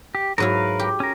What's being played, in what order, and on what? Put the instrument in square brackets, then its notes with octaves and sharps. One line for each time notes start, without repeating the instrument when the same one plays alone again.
[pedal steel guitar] G4
[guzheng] G#2 F#3 E4 [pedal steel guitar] A#4 B4 F5
[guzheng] G4
[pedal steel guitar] C#4 A#4